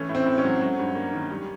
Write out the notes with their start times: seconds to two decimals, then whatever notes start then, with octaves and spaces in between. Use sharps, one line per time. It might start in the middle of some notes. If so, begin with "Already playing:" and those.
Already playing: E3 A3 C#4
0.09 A2
0.15 C4
0.26 A2
0.38 C#4
0.45 F#3
0.61 F#3
0.79 G2
0.95 A#3
1.14 D#3
1.31 G3